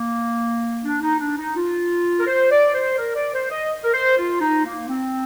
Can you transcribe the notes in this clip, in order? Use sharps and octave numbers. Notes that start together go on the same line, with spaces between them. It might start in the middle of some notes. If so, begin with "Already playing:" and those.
Already playing: A#3
D4
D#4
D4
D#4
F4
A#4
C5
D5
C5
A#4
D5
C5
D#5
A#4
C5
F4
D#4
A#3
C4